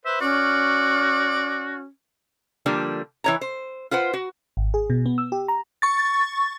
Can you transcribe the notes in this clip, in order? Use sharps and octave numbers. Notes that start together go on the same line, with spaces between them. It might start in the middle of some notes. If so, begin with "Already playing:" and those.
B4 C5 E5
C#4 F#4 D5
D3 F3 G3 A#3 D4
E3 C#5 A#5
C5
F4 B4 C5 F#5
F#4
G#1
G#4
B2
B3
E6
G4
A#5
C#6 A6